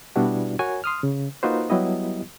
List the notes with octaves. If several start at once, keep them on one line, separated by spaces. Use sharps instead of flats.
B2 G3 B3 D4 E4 F#4
F#4 A#4 C#5 G#5
C6 D#6 F6
C#3
A#3 D#4 F4 F#4 B4 C5
F#3 G3 B3 E4 G4 D#5